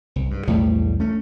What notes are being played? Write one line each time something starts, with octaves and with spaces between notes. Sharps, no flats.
C2
G2
B1 E2 A2 G3 A3
A3 C#4